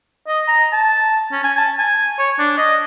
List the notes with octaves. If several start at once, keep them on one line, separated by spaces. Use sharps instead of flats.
D#5
A#5
A5
C#4
G#5
A5
G#5
C#5
D4
D#5